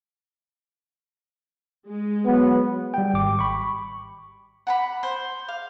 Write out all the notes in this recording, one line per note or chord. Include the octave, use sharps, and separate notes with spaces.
G#3
F#3 B3
G3 G5
G#1 D6
B5 C#6
F#5 A#5 B5
C5
F5